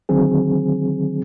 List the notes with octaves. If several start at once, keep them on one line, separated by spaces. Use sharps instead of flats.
D3 D#3 F#3 C4 G#4